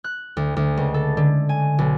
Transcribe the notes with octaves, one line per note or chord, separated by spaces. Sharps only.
F#6
D2
D2
C#2
A4
D3
G#5
B1